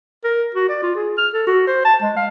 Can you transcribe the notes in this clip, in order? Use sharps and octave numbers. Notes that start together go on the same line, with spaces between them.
A#4
F#4
D5
F4
G#4
F6
A4
F#4
C5
A5
G#3
F5